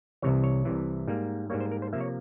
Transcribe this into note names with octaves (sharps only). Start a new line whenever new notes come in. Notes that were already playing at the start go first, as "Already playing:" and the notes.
C2 C3 E3 C#5
C#5
C2 C3 E3
G#2 G3 A#3
G#2 G3 A#3 C#5
C5
A#4
C5
C3 F3 A#3 E5
C#5